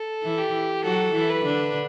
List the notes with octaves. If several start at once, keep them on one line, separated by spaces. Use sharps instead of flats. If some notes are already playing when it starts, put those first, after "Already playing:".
Already playing: A4
E3 E4
G4
F#3 F#4 A4
E3 E4
B4
D3 D4